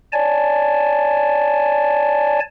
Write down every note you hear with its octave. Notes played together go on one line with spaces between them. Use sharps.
C#5 D5 G#5 A5